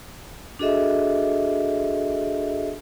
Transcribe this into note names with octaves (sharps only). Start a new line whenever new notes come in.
D4 F#4 G#4 A4 D#5 E5